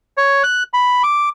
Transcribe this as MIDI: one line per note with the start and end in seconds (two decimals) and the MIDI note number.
0.17 0.43 73
0.43 0.63 90
0.74 1.02 83
1.03 1.29 86